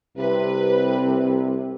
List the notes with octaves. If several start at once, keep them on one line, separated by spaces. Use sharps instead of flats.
C2 C3 B4